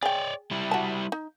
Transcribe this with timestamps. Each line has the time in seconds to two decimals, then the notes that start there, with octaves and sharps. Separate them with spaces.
0.03 G#4 C#5 D5 G5
0.51 G3 E4
0.71 F#4 A5
1.12 D#4